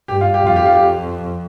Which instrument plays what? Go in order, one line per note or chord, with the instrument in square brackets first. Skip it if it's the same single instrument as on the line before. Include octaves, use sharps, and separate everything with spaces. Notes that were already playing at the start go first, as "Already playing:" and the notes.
[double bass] G2 [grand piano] G4
[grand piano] F4
G4
[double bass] F2 [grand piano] F4
[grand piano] G4
F4
G4